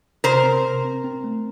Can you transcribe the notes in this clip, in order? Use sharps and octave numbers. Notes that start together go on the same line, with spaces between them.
C3 A#4 C5
C4
C3
C4
C4
A3